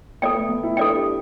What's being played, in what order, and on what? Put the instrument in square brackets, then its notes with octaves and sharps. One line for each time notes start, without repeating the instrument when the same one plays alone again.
[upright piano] B3 [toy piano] A4 D5 G5
[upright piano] A3
B3
E4
[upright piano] D4 [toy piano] A4 D5 G5
[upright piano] G4